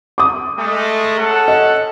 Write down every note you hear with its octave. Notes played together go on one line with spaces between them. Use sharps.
D6 D#6
G#3 A3
C#4 A4 F#5
D#5